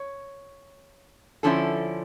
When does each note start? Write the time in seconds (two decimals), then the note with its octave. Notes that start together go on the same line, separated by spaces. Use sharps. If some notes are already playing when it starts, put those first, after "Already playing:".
Already playing: C#5
1.43 D3 F3 C#4 E4 A4